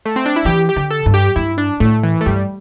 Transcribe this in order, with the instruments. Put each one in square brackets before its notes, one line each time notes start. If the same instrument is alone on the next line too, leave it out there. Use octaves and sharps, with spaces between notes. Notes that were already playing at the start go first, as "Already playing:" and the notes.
[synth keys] A3
C4
D4
E4
[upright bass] E3 [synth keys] G4
[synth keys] G4
[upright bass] D3
[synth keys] A4
[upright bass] G2
[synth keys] G4
[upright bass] G2 [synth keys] E4
[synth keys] D4
[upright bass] A2 [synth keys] A3
[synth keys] E3
A3
[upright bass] G2 [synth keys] G3